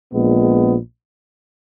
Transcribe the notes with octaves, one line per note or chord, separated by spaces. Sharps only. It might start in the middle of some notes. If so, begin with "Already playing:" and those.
A#1 A#2 G#3 B3